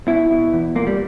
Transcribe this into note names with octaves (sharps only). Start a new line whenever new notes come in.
B2 E4
B2
E2
A#2 A#3
G3